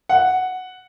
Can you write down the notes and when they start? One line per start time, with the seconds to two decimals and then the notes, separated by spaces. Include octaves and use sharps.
0.09 F#5